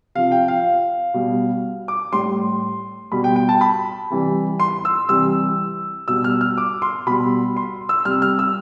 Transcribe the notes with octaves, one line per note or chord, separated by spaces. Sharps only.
C3 F3 F5
G5
F5
B2 G3
D6
A2 G3 C6
B2 G3 B5
G5
G5
A5
B5
C3 E3 G3
C6
E6
C3 E3 G3 E6
B2 G3 E6
F6
F6
D6
C6
B2 G3 B5
C6
E6
C3 G3 F6
F6
E6